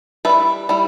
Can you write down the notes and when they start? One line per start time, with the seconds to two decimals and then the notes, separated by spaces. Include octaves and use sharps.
0.25 G3 E4 B4 E5
0.69 G3 E4